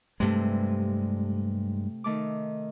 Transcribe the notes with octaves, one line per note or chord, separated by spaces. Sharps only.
G2 C3 G#3 A3
D#3 A3 D6